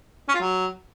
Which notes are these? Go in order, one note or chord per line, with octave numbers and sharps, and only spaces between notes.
C#4
F4
F#3